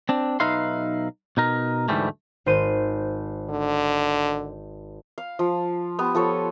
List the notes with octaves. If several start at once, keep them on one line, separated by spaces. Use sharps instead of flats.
C4 D4
B1 D#4 B4 E5 F5 C6
B2 D#4 A#4
D2 G#2 E3 G3 A3
G#1 C5 D#7
D3
F5
F3
B3 G4
F3 A4 C#5